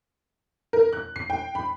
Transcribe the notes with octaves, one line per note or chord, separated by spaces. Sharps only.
A#4
F#6
C7
G5
B5